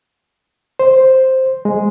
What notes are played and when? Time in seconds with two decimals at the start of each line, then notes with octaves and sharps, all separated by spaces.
0.79 C5
1.65 G#3